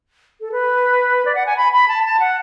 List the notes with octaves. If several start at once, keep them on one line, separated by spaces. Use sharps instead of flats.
A4
B4
D5
F#5
G#5
B5
B5
A5
A5
F#5